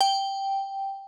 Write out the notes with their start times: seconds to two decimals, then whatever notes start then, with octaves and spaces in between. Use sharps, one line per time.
0.01 G5